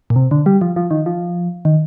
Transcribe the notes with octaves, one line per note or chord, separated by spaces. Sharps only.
A#2
C3
D3
G3
F3
F3
D#3
F3
D#3